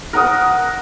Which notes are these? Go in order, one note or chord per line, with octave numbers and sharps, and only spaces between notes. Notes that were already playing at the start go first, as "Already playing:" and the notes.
A#4 F#5 D#6